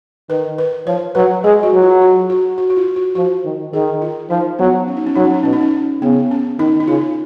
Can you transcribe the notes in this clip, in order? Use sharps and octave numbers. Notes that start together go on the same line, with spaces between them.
D#3 B4
B4
F3 C#5
F#3 B4
G#3 G#4
F#4
F#3
F4
F#4
F#4
F#4
F#4
F4
F#4
F3 F#4
D#3
D#3 G#4
F4
F3 D#4
F#3 B3
C#4
D#4
C#4
F#3 D#4
C#4
D#4
B2 C#4
D#4
C#4
C#3 B3
C#4
D#3 D#4
D#4
C#3 F4